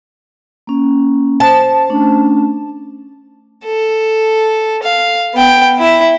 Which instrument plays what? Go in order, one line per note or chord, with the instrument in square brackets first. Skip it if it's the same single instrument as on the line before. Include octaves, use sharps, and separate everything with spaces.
[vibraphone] A#3 C#4
[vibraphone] C5 [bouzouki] A5
[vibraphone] A3 C#4 D4
[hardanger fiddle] A4
F5
B3 G5
E4 E5